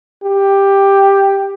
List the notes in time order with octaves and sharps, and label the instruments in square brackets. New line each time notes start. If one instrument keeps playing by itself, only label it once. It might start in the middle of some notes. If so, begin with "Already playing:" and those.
[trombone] G4